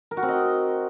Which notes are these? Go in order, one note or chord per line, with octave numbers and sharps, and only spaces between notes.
A#4
F#4
C4
D#5